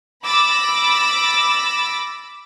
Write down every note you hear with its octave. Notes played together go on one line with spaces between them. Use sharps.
B5 D6 E6 A6 A#6